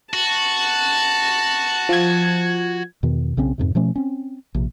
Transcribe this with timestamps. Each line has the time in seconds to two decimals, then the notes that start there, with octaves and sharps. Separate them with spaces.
0.14 F#4 A5
1.89 F3 G#6
3.03 E2 B2 D#3
3.37 B1 C#3 C4 C#4
3.58 F2 G#2 C3
3.75 B2 F3 A3 C#4
3.96 C4 C#4
4.54 A#1 C3